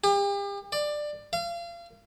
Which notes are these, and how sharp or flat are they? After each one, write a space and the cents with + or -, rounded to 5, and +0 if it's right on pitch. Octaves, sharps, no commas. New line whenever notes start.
G4 +40
D5 +15
F5 -35